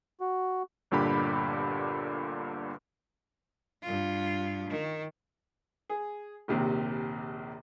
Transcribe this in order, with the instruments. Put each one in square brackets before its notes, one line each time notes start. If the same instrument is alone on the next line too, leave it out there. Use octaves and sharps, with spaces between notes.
[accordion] F#4
[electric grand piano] G1 G2 A#2 D3 G4 B5
[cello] G2 F4
D#3
[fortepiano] G#4
A#1 D#2 C3